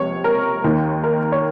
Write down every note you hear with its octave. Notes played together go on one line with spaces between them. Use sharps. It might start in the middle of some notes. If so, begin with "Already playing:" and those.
Already playing: C#2 C3 F3 C#5
A#4
D#2 D#3
A#4
C#5